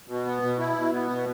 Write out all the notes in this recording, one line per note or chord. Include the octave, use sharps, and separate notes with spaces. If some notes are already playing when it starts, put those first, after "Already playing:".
B2
B3
B2
E4
B2
B3
B2